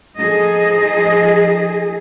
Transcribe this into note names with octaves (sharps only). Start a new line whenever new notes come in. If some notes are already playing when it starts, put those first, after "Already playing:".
F3 D#4 G#4 A4 D#5